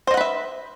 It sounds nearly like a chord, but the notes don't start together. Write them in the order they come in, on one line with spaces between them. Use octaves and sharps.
C5 D#5 F#5 B4 E5